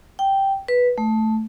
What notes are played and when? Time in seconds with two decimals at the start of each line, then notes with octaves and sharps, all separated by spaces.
0.19 G5
0.68 B4
0.98 A3